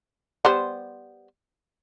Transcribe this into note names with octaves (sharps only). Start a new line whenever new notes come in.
G3 B3 C5